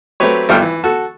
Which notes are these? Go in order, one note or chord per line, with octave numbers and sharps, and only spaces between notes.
F#3 A3 C4 G4 B4 C#5
G#1 G3 F4 A4 G5 F6
E3
F#4 A4